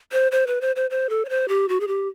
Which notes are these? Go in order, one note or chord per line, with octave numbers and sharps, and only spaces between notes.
C5
C5
B4
C5
C5
C5
A4
C#5
C5
G4
F#4
G#4
G4